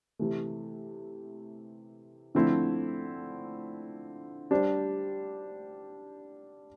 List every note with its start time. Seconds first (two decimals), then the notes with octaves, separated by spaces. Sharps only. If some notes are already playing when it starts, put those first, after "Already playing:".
0.19 C3 E3 A3
2.35 D3 F3 A3 C4 E4
4.51 G3 D4 G4 C5